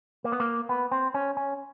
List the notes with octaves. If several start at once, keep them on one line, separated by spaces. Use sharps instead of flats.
A#3
B3
A#3
B3
C4
C#4
C#4